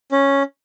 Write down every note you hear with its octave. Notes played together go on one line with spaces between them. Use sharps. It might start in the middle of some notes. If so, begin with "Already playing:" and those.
C#4